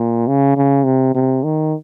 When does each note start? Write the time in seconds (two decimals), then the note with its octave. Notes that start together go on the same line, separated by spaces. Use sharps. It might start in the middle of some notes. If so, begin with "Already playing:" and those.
Already playing: A#2
0.27 C#3
0.57 C#3
0.85 C3
1.15 C3
1.44 D#3